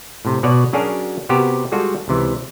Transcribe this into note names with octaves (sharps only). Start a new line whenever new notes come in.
A2 C3
B2 C#5 D5 F#5
F#3 C#4 D4 F#4 G#4 A#4
C3 B3 F#4 G4 A#4
G3 G#3 F4 F#4 A4
C#2 C3 E3